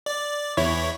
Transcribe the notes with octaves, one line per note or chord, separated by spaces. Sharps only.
D5
E2 E4 C#5